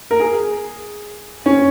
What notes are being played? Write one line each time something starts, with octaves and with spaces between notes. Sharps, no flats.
A#4
G#4
C#4